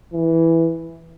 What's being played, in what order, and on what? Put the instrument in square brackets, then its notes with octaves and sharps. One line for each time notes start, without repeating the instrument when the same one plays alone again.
[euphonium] E3